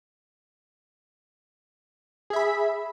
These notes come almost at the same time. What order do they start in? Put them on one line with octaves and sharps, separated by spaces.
G#4 E5 B5